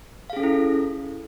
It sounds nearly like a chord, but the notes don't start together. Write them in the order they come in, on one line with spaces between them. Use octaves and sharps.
F5 G#4 C#4 A4 E4